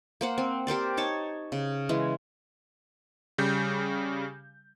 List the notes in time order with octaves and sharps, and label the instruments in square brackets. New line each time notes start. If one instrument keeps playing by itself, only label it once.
[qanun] A#3 C5 F#5
C4
G4 A#4 C5 D5
D#4 C#5 A5
C#3
E3 G#3
[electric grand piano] C#3 G3 G6